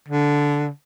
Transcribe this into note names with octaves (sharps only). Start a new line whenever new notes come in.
D3